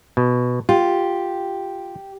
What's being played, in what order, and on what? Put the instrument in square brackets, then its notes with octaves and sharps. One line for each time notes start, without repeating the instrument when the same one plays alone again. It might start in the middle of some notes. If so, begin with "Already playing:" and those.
[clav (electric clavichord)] B2
[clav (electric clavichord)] F4 [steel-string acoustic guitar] G4